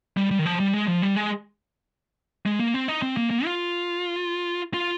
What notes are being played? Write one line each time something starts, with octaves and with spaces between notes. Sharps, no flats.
G3
G3
D#3
F3
G3
G#3
F3
G3
G#3
G#3
A#3
C4
D#4
C4
A#3
A#3
F4
F4